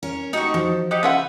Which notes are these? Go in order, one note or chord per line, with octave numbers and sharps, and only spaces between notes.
C#4 A#4 C#5
A3 D#4 F#4 G4 C#6
F3 F#4
D#4 G4 F#5
C#3 F4 B4 E5 F#5